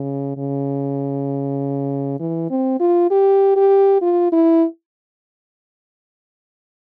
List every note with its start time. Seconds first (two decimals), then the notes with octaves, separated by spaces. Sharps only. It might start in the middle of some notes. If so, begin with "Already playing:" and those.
Already playing: C#3
0.37 C#3
2.20 E3
2.50 C4
2.80 F4
3.11 G4
3.56 G4
4.02 F4
4.32 E4